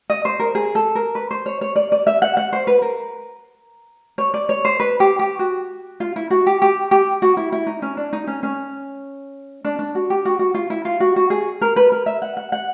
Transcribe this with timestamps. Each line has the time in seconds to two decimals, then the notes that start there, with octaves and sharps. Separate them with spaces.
0.10 D#5
0.25 C5
0.39 A#4
0.55 G#4
0.75 A4
0.95 A#4
1.15 B4
1.31 C5
1.46 C#5
1.61 C#5
1.76 D5
1.92 D5
2.07 E5
2.22 F#5
2.37 F#5
2.53 C5
2.67 B4
2.82 A#4
4.18 C#5
4.34 D5
4.49 C#5
4.65 C5
4.80 B4
5.00 G4
5.19 G4
5.39 F#4
6.00 F4
6.16 E4
6.30 F#4
6.47 G4
6.62 G4
6.91 G4
7.22 F#4
7.37 E4
7.52 E4
7.67 D#4
7.82 C#4
7.97 D4
8.13 D#4
8.27 C#4
8.43 C#4
9.65 D4
9.79 D4
9.95 F#4
10.10 G4
10.25 F#4
10.39 F#4
10.54 F4
10.70 E4
10.85 F4
11.00 F#4
11.16 F#4
11.30 G#4
11.62 A#4
11.76 B4
11.92 A#4
12.06 E5
12.22 F#5
12.37 F#5
12.52 F#5